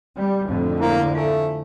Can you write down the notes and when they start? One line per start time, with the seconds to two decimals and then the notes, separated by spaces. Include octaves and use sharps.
0.17 G3
0.47 F2 A2 D3
0.80 A#3 E4
1.13 A3 E5 F5 G#5